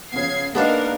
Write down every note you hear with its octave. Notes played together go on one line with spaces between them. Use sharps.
C#3 F3 B3 G#6 C7
G#3 A#3 B3 D4 D#4 A#4 F5